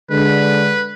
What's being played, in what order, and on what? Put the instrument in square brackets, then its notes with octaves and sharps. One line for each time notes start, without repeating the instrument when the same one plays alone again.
[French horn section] D3 G#3 [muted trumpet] B4